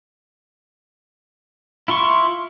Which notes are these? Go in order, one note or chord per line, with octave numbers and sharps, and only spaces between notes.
E4 F4 C6 C#6